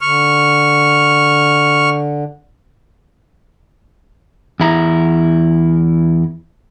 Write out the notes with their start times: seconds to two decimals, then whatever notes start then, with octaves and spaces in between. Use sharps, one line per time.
0.01 D3 C#6 F6
4.60 E2 E4 A#5